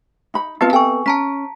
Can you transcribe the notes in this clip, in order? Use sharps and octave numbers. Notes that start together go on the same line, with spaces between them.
D#4 B5
B3 C4 F4 B4 F5 A5
A4 G5 G#5 C#6
C#4 A5 A#5 B6